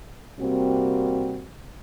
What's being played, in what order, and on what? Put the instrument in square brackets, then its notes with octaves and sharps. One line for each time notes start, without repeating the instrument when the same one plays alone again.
[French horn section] C3 G3 A#3 C4 F#4